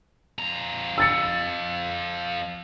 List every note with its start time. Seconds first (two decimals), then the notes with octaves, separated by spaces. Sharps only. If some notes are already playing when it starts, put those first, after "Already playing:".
0.39 F2 A#5
0.98 E6 A6 C#7